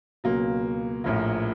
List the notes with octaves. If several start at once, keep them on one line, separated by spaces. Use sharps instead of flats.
C#2 B2 F#3 A#3
A#1 A2 F3 A#3